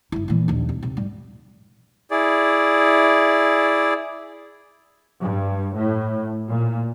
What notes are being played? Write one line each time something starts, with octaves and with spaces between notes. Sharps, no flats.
G1 E4
A#2 E3
A#1 D#2
C2
C3
G#2 G3
E4 G#4 D5
G2
A2
A#2